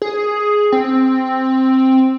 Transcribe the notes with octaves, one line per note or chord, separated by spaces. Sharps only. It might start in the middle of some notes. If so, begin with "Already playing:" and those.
G#4
C4